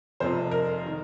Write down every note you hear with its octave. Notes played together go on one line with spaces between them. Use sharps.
F1 F2 C3 C5
A#4
D#3